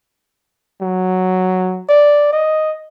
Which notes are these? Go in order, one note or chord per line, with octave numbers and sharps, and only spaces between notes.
F#3
D5
D#5